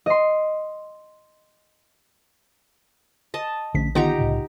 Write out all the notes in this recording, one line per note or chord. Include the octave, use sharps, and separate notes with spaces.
D#5 C6
D#5 A5
A#1 D3 A3 C#4 B6
D3 D#3 B3 D#4 F4 G4 F#5 A#5
C2 A2 C#3